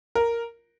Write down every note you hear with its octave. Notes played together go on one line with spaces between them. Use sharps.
A#4